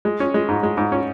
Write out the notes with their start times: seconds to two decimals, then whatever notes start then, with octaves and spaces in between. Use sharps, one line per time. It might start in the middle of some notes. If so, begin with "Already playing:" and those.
0.05 G#3
0.20 C#4
0.34 G#3
0.49 G#2
0.63 G#3
0.77 G#2
0.92 C#4